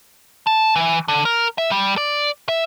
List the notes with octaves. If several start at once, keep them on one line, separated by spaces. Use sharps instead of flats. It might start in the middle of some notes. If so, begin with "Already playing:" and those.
A5
E3
D3
A#4
E5
G3
D5
E5